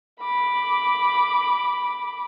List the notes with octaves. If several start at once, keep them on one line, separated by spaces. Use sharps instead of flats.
B5 D6